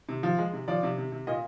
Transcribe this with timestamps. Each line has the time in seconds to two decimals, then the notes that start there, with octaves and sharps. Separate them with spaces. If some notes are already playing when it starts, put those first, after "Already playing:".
0.09 C3
0.23 F3
0.39 G#3
0.53 C3
0.68 F3 D5
0.83 C3
0.98 C3
1.12 C3
1.27 A#2 D#5